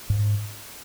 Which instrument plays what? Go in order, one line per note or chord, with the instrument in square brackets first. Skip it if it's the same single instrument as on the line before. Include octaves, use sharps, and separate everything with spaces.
[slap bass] G#2